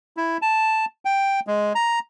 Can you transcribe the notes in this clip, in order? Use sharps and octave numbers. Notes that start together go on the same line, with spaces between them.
E4
A5
G5
G#3
A#5